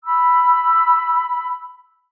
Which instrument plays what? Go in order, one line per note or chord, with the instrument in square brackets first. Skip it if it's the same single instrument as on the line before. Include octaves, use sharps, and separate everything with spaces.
[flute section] B5 E6